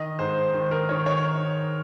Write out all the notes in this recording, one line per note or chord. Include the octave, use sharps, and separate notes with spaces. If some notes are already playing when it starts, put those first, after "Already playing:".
Already playing: D#3 D#5
G#2 C5
D#3
A#4
D#3 C#5
C#5